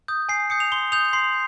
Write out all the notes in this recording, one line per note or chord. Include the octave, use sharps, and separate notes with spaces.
D#6 G6
G#5 C7
D#6 G6 C#7
F7
C6 G7
D#6 G6 F7
C6 C7